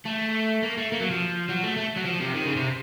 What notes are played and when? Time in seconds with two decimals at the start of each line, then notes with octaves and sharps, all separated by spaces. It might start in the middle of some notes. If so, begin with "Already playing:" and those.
0.05 A3
0.63 A#3
0.77 A3
0.92 A#3
1.00 F#3
1.11 F3
1.49 F#3
1.63 A3
1.77 A3
1.96 F#3
2.05 F3
2.20 C3
2.34 D#3
2.45 C#3
2.56 C3